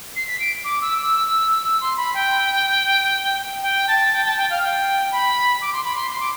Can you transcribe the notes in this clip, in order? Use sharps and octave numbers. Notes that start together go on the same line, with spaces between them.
C7
B6
D7
D6
E6
E6
E6
C6
B5
G5
G5
A5
G5
A5
G5
F5
G5
B5
D6
C6
B5
C6
C6
D6